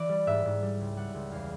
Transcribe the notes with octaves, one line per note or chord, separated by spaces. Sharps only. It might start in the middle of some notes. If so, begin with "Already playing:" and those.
Already playing: E3 D5
G3
G#2 E5
G#2
G3
C#2
G3 F#5
C#2
E2 F5